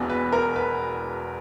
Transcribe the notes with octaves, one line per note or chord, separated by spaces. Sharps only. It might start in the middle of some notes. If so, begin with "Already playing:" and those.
Already playing: E1 E2 B2
B4
A#4
B4